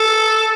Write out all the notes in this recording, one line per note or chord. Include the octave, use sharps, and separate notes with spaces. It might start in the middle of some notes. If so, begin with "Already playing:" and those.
Already playing: A4